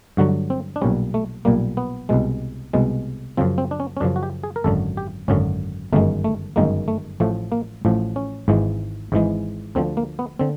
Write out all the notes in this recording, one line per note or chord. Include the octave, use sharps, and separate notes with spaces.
G2 D3 F#3 F#4
C4
D4
B1 A#2 G3 C#4
A3
B1 A#2 G3 A#3
B3
C2 B2 G#3
C2 B2 G#3
F#2 C#3 F3 C4
C4
D4
C#4
C#4
F#2 C#3 F3 D4
F#4
G4
G#4
A#4
G#1 F#2 D3 F#3 A4
G4
G#1 F#2 D3 F#3 C#4
G1 F#2 D#3 G#3 A3
A3
G1 F#2 D#3 G#3 A#3
A3
A1 A2 F3 A3
A#3
A1 A2 F3
C#4
G#1 G#2 E3 G#3
G#1 G#2 E3 G#3
D2 D3 F3 C4
A#3
B3
D3 C4